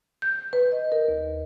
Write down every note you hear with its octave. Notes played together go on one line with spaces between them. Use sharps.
G6
B4
D#5
A#4
D#2